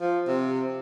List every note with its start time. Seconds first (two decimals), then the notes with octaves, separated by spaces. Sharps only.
0.01 F3
0.27 C3